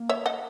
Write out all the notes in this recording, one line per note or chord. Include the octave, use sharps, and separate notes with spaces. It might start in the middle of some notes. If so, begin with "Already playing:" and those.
Already playing: A#3
C#5 E5
D#5 F#5